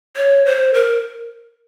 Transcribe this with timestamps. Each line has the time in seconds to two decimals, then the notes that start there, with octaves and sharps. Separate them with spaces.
0.17 C#5
0.45 C5
0.74 A#4